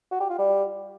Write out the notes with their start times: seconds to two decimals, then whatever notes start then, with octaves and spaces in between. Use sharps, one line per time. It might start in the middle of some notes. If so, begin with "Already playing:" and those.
0.11 F#4
0.20 G4
0.29 F4
0.39 G3